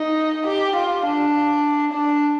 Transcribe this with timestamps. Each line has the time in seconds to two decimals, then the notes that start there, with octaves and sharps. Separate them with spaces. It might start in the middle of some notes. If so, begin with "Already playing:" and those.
Already playing: D#4
0.47 G4
0.76 F4
1.06 D4
1.93 D4